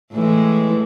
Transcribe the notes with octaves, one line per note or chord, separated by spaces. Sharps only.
A2 E3 G#3